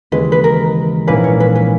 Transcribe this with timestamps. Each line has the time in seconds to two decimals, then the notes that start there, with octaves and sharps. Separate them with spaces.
0.12 D#2 C#3 E3 G#3 B4
0.32 B4
0.44 A#4
1.07 A#1 G#2 E3 A#3 C#4 B4
1.24 C#5
1.40 B4
1.56 B4